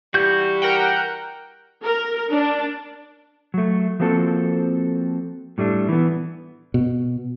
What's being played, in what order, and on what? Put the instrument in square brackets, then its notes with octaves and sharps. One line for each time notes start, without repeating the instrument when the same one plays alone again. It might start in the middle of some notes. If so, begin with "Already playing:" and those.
[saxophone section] E3 G3 G4 [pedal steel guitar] F#4 G6
[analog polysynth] A#4 F#5 G5
[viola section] A#4
D4
[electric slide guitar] F#3 A3
F3 A#3 C4 F#4 A4
A2 G3 A3 D4
E3 B3
[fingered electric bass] B2